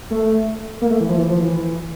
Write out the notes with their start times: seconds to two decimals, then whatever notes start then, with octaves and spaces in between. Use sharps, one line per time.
0.11 A3
0.81 A#3
0.90 A3
1.00 E3
1.09 F3
1.18 E3
1.30 F3
1.42 E3